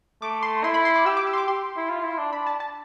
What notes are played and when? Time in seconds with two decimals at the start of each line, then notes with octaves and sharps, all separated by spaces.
0.22 A3 D6
0.43 C6
0.64 E4 C6
0.74 B5
0.85 C6
0.95 D6
1.06 G4 E6
1.17 D6
1.27 E6
1.33 C6
1.38 D6
1.48 G4 C6
1.77 E4
1.90 F4
2.04 E4
2.18 D4
2.33 D4 B5
2.47 A5
2.60 A5